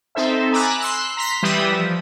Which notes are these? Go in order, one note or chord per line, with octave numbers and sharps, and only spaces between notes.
C4 D#4 A4 C5 E5
G#5 A#5 B5 D6 E6 F#6
C6 E6 F#6
A#5 C6 B6
E3 G3 G4 B4 E5 D#6
F3